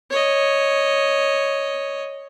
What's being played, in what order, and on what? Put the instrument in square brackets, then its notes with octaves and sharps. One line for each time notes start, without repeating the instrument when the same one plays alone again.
[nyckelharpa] C#5 D#5